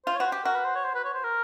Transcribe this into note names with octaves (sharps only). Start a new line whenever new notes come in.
F4 C5
C#5
F#4 B4
C5
G4
F#4 A#4
B4
C5
C#5
C5
B4
C#5
C5
A#4